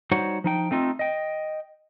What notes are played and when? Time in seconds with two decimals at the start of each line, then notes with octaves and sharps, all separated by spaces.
0.11 G3 D#4 F#4 C5 C#5 F#5
0.44 F3 D#4 G5
0.71 A3 C4 D#4 F4
0.99 D#5 G5